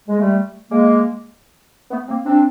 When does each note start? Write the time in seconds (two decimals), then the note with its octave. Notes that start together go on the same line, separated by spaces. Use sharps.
0.09 G#3
0.20 G3 A3
0.71 G#3 A#3
1.91 A3 B3
2.09 A#3 C4
2.26 C4 D4